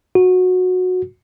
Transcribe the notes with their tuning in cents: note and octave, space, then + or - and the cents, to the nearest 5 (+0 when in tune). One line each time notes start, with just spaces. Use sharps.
F#4 -15